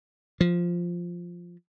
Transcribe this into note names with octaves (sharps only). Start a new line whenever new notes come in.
F3